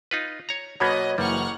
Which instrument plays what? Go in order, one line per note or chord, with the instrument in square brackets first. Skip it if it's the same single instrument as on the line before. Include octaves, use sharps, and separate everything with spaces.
[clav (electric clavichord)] D#4 F4 B4
C#5 A#5
[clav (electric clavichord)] B2 A#3 B3 [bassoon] F#3 [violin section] B4 D#5 [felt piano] B5 G#6
[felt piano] F#1 [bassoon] E3 [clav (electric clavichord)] G3 [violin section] F#5 C#6 F6